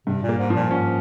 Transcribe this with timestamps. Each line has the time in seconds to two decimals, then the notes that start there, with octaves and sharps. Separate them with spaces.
0.07 G2 C3
0.23 A#2
0.29 A#3
0.38 G#2
0.50 F3
0.55 A#2
0.71 G#2 C#4